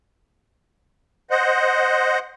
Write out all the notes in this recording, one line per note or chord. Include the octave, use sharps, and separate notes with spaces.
C5 D#5 F#5